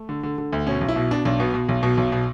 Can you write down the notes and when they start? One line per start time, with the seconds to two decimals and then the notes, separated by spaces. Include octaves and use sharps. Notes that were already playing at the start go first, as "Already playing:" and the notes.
Already playing: A3
0.09 D3
0.23 D3
0.38 D3
0.53 D2
0.67 B2 C#4
0.81 B1
0.89 E4
0.96 B2
1.11 B2 D4
1.25 B1 D4
1.40 B2 B3
1.54 B2
1.69 B1
1.83 B2
1.97 B1
2.12 B2